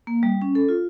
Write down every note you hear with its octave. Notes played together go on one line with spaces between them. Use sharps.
A#3
G3
C#4
A4
F4